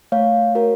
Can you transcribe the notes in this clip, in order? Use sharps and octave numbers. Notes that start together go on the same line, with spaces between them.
A3 C#5 F5
F#4 A#4 C#5